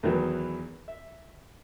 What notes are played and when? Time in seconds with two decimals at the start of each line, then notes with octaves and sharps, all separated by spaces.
0.03 E2 D#3 E3 F#3
0.88 E5